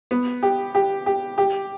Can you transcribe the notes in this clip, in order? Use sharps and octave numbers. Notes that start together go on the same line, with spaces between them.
B3
G4
G4
G4
G4